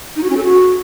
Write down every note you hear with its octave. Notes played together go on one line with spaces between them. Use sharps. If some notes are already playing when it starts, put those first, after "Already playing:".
D#4
F#4
C#4
A4
F#4